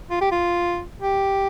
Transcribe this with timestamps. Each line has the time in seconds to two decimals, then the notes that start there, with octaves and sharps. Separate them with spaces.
0.11 F4
0.21 G4
0.32 F4
1.02 G4